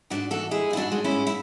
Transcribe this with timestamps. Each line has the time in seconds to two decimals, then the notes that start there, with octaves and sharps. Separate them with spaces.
0.10 G#2 D4 F#4
0.31 E3 F#4 A4
0.51 G#3 E4 G#4
0.71 G#2 E4
0.77 D4 F#4
0.92 G#3
1.04 C#4 E4
1.11 G#2
1.27 E4